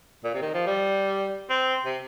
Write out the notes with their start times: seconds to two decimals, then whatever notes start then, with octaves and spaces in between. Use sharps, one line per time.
0.24 A#2
0.34 C3
0.42 D#3
0.54 F3
0.67 G3
1.50 C4
1.85 C3